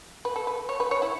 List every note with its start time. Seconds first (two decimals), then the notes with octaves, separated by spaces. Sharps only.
0.25 B4
0.36 A4
0.47 B4
0.69 C#5
0.80 B4
0.91 C#5
1.02 E4